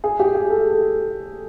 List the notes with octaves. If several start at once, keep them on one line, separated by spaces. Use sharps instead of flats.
G#4
G4
G#4
A4